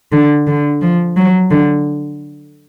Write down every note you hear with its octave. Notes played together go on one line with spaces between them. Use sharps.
D3
D3
F3
F#3
D3